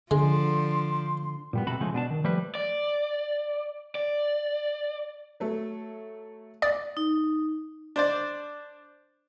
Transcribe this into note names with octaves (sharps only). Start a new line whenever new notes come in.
D3 F3 G#3 D4 C6
A#2 G3 B3
B1 C3 F#4 A4 B5
C#3 F3 G#3 A3
B2 D4 A5
D#3
F3 G3 A3 B4
D5
D5
F#3 A3
D5 D#6
D#4
D4 C5 D5